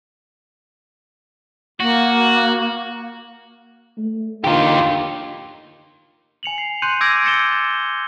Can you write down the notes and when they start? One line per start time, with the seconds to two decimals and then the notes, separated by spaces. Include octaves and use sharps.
1.80 A#3 F#4
3.98 A3
4.44 D3 D#4 F4 G4
6.43 G#5 C#7 F7 F#7
6.58 C7
6.82 C6 F#6 G6 C#7 D#7
7.01 D6 E6 G6 G#6 A#6 D7
7.23 G6 A6 A#6 C#7 E7 G7